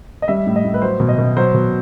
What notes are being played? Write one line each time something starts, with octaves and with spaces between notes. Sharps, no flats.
D#5
G3 E5
A2
D#5
A2
B4
F#3 C5
B2
D#5
B2
F#3 C5
B2